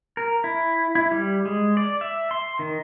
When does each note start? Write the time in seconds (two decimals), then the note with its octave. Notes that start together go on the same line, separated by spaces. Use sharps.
0.17 A#4
0.44 E4
0.95 E4
1.12 G3
1.45 G#3
1.77 D5
2.01 E5
2.31 C6
2.59 D#3